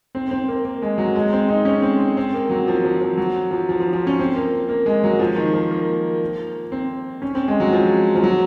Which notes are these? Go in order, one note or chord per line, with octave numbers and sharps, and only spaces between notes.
C4
C4
A#3
A#3
G#3
F#3
G#3
C4
D#4
C#4
C4
C4
C4
A#3
F#3
F3
F3
F3
F#3
F3
F3
F3
F3
C#4
C4
A#3
A#3
G#3
F#3
F3
D#3
F3
A#3
C4
C#4
C4
G#3
F#3
F3
F3
F#3